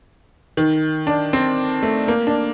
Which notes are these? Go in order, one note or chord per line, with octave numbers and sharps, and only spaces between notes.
D#3
D4
C4
A3
A#3
D4